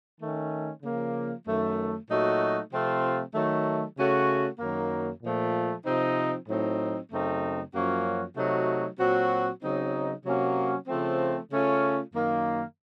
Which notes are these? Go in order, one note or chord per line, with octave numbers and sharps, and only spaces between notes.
D#3 A3 C#4
C#3 F3 A#3
F#2 D#3 A3
A#2 F#3 A3 D#4 F#4
C3 F3 A3 C4 F4
D#3 F#3 A3
C#3 A3 C#4 F#4
F#2 D#3 F#3 A#3
A#2 F3 A3
C3 F3 C4 D#4
A2 F#3 C4 D#4
F#2 C#3 A3 C4 D#4
F#2 F3 A#3 C#4 F#4
C3 F#3 A3 D#4 F#4
A#2 F#3 C4 F#4
C#3 F#3 C4 D#4
C3 F#3 A#3 C#4 F#4
C#3 F3 A3 C4
C#3 A3 C#4 F4
F#2 D#3 A#3